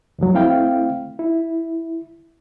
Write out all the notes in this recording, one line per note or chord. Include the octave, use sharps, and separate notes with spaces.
C#2 G2 F3 F#3
A3 C4 E4 F5 G5
E4